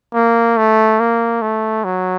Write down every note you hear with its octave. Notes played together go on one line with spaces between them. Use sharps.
A#3
A3
A#3
A3
F#3